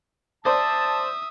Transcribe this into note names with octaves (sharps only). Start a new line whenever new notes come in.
C5 D5 E5 A5 D#6